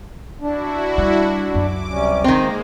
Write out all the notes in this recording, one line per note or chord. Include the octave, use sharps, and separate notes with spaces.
D4 E4 F#4
G3
C#2 F#2 D6
C3 G3 C#4
D#3 G#3 A#3 C4 A#5